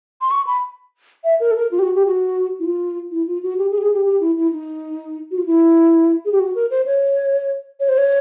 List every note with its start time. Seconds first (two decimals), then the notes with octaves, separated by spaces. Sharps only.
0.21 C6
0.31 C#6
0.47 B5
1.24 E5
1.40 A#4
1.51 A4
1.56 A#4
1.71 F4
1.79 G4
1.83 F#4
1.95 G4
2.06 F#4
2.60 E4
2.65 F4
3.11 E4
3.27 F4
3.43 F#4
3.58 G4
3.71 G#4
3.78 G4
3.82 G#4
3.94 G4
4.05 G4
4.21 E4
4.36 E4
4.52 D#4
5.31 F#4
5.38 F4
5.46 E4
6.25 G#4
6.32 G4
6.40 F#4
6.55 A#4
6.71 C5
6.86 C#5
7.80 C#5
7.89 C5
7.98 C#5